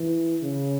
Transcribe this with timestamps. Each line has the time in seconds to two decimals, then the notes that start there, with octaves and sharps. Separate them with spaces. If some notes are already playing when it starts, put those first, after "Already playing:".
Already playing: E3
0.42 C#3